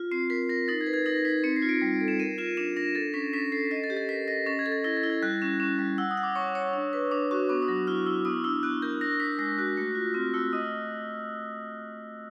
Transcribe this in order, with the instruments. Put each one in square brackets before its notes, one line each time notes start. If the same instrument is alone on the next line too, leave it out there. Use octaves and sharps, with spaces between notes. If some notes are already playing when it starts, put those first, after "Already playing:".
Already playing: [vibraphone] F4
[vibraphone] C4 [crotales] C7
[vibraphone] A#4 [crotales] B6
[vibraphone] A#4 [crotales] A#6
[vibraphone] D#4 [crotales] A6
[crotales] G#6
[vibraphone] B4
[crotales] G#6
[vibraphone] D#4 [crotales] A#6
[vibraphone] D#4 [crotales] B6
[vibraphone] C4 [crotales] C#7
[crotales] C7
[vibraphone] F4
[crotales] D7
[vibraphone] G3
A4
[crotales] E7
[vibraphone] A#4 [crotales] D#7
[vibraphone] F4 [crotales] E7
[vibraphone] D4 [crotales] E7
[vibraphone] D4 [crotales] A#6
[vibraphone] A4 [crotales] A6
[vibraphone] C#4 [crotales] B6
[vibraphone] C#4 [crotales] B6
[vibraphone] A4 [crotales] C7
[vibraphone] D#5 [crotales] B6
[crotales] A6
[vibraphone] G4
[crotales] A6
[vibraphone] A#4 [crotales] B6
[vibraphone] D#5 [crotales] A#6
[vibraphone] C#4 [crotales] A6
[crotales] G#6
[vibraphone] A4
[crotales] A6
[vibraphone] E4 [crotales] A#6
[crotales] A6
[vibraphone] E4
[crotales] G#6
[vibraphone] G3 [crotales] F#6
[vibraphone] C#4
C#4
G3
[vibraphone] F#5 [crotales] E6
[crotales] D#6
[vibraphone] F#5
[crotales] D6
[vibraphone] C#5 [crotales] C#6
[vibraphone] C#5
D4
B4
[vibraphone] D4 [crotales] D6
[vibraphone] F#4 [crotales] C#6
[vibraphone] B3 [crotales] D6
[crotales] D#6
[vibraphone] F#3
[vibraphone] E4 [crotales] F6
[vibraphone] E4 [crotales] E6
[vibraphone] B3 [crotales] D#6
[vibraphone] D4 [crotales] E6
[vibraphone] B3 [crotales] F#6
[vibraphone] A#4 [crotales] G6
[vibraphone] D4 [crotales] A#6
[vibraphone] D4 [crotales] B6
[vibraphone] G#3 [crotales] A#6
[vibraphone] F#4 [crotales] F#6
[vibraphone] A3
F4
[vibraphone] C4 [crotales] F6
[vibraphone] A3 [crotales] E6
[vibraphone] D#5 [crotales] D#6